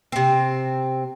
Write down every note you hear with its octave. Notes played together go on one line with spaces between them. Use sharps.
C3 C4